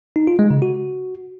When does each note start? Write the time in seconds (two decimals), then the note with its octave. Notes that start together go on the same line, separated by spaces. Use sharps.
0.16 D#4
0.27 F4
0.39 G#3
0.50 C#3
0.62 F#4